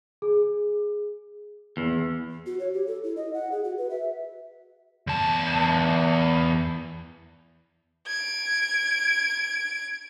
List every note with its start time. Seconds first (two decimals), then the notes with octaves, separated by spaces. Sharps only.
0.22 G#4
1.77 E2
2.46 F#4
2.60 C#5
2.73 G4
2.87 A4
3.04 E4
3.16 D#5
3.34 F#5
3.52 G#4
3.64 F#4
3.78 B4
3.90 E5
5.07 E2 A5
8.08 G#6 D7